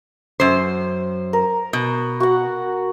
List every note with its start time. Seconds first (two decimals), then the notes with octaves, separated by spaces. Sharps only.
0.40 F#2 C5
1.33 A#4
1.73 B2
2.20 F#4 F#5